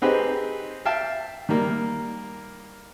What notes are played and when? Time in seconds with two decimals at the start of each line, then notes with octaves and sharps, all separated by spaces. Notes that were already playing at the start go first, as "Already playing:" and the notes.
0.02 C4 D#4 G4 G#4 B4 C5
0.85 E5 F5 G5 A5
1.49 D#3 G3 A#3